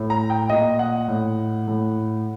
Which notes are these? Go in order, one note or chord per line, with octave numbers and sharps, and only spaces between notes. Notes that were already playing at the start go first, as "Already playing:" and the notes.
Already playing: A2
A#5
G5
A#2 D#5
F#5
A2
A2